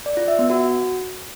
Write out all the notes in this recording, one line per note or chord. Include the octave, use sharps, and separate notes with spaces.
D5
F4
E5
B3
F#4